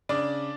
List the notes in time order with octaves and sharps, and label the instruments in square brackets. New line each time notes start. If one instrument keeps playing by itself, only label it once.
[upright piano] C#3 D4 D5